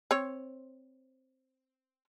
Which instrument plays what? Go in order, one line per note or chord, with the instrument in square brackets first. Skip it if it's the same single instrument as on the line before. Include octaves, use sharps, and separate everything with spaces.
[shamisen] C4 C#5